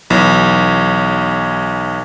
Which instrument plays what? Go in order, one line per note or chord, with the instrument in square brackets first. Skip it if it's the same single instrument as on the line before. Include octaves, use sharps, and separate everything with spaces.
[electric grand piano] B1 E3